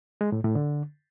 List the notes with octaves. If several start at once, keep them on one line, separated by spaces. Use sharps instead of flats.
G#3
A2
A2
D3